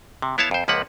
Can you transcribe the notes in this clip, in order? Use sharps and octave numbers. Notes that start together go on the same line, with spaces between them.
C3
B3 E4 C#5 F5 A5
F2 C5
C#2 F3 A#3 B4 F#5